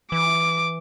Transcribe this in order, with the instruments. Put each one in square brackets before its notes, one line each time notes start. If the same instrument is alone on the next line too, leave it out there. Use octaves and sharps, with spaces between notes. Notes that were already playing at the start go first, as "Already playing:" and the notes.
[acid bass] E3 [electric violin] D6